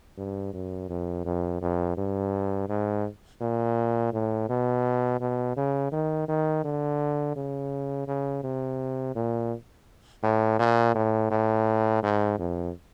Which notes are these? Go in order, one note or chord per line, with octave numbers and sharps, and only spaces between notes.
G2
F#2
F2
F2
F2
G2
G#2
A#2
A2
B2
B2
C#3
D#3
D#3
D3
C#3
C#3
C3
A#2
A2
A#2
A2
A2
G#2
F2